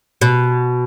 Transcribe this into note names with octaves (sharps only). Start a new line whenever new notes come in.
B2